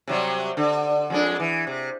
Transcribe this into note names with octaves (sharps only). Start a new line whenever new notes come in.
C3 F#3 G3
D3
F2 G#3 D4
E3
C3